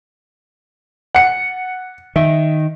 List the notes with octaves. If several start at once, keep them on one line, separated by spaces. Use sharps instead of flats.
F#5 C#7
D#3 E5